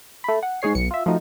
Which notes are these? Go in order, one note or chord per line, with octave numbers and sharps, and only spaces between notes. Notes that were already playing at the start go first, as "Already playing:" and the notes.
A3 B5
F#5
G#2 G#3 G#4 C#5 C7
B1 C#7
F4 E5
F3 A3 D#4 F#4